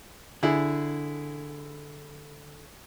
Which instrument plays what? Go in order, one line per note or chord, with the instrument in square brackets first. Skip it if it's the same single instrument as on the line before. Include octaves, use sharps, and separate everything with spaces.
[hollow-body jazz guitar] D3 [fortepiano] E4 G#4